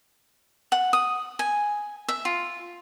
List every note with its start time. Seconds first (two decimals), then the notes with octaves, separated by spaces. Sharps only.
0.72 F#5
0.93 D#6
1.39 G#5
2.08 E5
2.25 F4